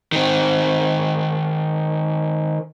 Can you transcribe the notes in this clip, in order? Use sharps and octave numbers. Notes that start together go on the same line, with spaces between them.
D#3 C4